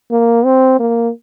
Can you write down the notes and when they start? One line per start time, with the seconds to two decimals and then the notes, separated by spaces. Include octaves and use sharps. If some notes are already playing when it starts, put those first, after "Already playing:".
0.11 A#3
0.45 C4
0.79 A#3